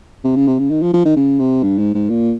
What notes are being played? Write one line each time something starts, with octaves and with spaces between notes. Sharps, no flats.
C3
C#3
C3
C#3
D#3
F3
F3
D#3
C#3
C3
G2
G#2
G#2
A#2